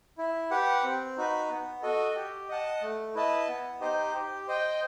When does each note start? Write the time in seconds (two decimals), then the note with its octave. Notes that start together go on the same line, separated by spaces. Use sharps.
0.18 E4
0.51 G4 B4 F#5
0.84 C4
1.17 D#4 F#4 B4
1.50 B3
1.82 F#4 A4 D#5
2.15 G4
2.49 D#5 F#5 A5
2.82 A3
3.15 E4 B4 D#5 A5
3.48 B3
3.81 D#4 G4 C5 D#5
4.14 G4
4.47 C5 D#5 G5